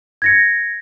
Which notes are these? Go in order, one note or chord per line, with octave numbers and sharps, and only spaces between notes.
G#6 A#6 C#7